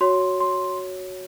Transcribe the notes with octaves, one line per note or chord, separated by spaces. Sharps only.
F#4 C#5 C6
C6